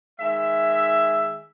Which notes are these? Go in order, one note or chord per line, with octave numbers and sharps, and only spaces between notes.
D#3 G#3 E5